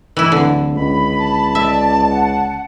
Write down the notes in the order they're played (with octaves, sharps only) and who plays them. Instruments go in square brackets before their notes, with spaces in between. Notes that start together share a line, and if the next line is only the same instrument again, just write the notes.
[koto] E3 E4
[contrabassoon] D1 [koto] D3
[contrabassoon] C#2 [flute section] B5
[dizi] A5
[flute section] D5 [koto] E5
[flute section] F#5